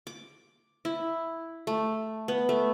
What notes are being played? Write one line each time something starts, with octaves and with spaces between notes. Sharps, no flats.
D6
E4
A3
B3
A3